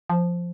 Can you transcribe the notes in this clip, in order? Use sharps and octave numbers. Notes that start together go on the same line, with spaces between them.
F3